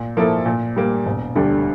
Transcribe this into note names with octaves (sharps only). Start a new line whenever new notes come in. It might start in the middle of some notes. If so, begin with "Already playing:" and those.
Already playing: A#2
F3 A#3 E4 A4
A#2
G3 A#3
E1
D2 D3 G3 D4